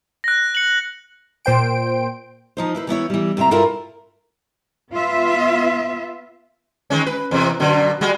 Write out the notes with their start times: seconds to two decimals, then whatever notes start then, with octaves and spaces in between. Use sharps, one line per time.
0.24 F#6 A#6
0.55 C#7 F#7
1.45 A#2 C5 G5 D7
2.57 F3 D#4 C5
2.75 E4 B4 C5
2.87 E3 B3 E4 C#5
3.10 E3 G3
3.37 D2 C3 C4 E5 A#5
3.51 G2 E4 F4 A4 A#4 E5
4.92 B3 F4 E5
6.90 D#3 G#3 C#4
7.06 B4
7.31 E2 C3
7.60 F#2 B2 D3
8.01 G3 G#3 F#4